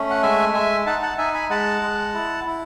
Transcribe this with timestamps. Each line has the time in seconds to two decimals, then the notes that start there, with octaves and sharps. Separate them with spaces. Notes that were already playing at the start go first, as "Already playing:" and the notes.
Already playing: A3 C#4
0.11 F#5
0.22 G#3 E5 G#5
0.53 G#3 E5 G#5
0.86 D#4 F#5 A5
1.02 F#5 A5
1.18 D#4 E5 G#5
1.34 G#5 B5
1.50 G#3 F#5 A5
1.82 G#3
2.14 E4
2.46 E4